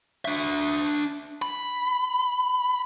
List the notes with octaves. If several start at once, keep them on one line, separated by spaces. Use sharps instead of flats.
D4 E5
B5